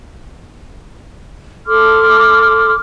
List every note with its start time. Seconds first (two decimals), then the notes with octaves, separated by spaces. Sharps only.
1.66 A4 C6 D6 F6